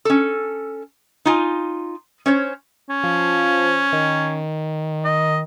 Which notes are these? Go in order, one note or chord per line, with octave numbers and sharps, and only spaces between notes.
C#4 A4
D#4 F4 G#5
C#4 C5 C#5
C#4
F3
D#3
D#5